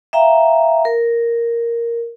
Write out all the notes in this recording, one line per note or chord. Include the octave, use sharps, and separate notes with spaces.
E5 F5 G5 A#5
A#4